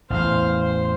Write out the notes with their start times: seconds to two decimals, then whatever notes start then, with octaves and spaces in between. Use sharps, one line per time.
0.10 A1 E2 C5 F5
0.61 C5